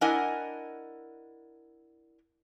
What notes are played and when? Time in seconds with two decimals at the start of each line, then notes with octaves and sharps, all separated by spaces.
0.01 D4 E4 A#4 D#5 F#5 G#5